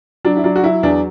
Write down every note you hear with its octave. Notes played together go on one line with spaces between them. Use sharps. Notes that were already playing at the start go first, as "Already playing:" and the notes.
F#3 D4
E4
F#3 D4
F#4
F#3 E4
E2 D4